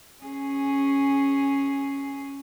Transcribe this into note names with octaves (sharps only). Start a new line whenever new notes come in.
C#4 G#4